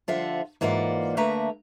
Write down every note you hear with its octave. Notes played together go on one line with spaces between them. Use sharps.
D3 F3 F4 C5 E5 F#5
G#2 E3 A#3 F4 D5 F#5
D3 A3 A#3 B4 E5 A#5